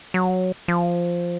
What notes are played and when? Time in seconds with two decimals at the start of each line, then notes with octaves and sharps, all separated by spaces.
0.14 F#3
0.68 F3